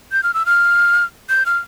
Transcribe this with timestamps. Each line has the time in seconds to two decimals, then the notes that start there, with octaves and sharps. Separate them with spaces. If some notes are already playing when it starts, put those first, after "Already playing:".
0.12 G6
0.23 F6
0.34 E6
0.46 F6
1.29 G6
1.46 F6